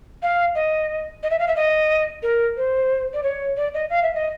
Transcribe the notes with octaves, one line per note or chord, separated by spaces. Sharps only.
F5
D#5
D#5
E5
F5
E5
D#5
A#4
C5
D5
C#5
D5
D#5
F5
E5
D#5